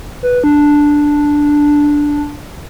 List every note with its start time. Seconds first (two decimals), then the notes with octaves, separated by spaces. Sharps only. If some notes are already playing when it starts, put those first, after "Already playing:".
0.23 B4
0.44 D4